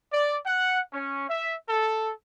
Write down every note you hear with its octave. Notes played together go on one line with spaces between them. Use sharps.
D5
F#5
C#4
E5
A4